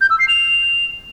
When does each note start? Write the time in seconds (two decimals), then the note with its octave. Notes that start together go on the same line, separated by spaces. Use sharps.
0.01 G6
0.10 E6
0.19 C7
0.28 F7